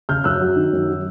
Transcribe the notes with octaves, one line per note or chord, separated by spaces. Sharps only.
C#3 F6 G6
F#2 E6 F#6
F#3
D#3
F#2
F#3